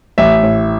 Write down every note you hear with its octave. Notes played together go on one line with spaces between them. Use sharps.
A1 E5
A2